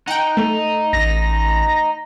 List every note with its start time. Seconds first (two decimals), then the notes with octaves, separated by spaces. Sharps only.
0.07 D#4 F#5 G5
0.37 A3
0.93 A1 A#6